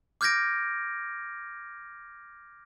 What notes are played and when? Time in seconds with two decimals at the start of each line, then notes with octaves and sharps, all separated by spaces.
0.21 D6 F6 G6 G#6 A#6 D7